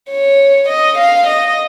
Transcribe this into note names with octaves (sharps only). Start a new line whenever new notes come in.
C#5
D#5
F5
D#5